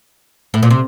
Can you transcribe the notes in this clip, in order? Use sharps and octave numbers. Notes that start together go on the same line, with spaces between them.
A2
A#2
C3